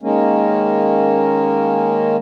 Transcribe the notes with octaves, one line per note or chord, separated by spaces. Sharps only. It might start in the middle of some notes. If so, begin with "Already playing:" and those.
D#3 G#3 A#3 C#4